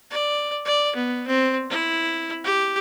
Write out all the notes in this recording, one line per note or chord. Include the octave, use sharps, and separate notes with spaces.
D5
D5
B3
C4
E4
G4